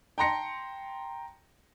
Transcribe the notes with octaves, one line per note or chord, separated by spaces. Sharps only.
G5 A5 A#5 C6 A#6 C#7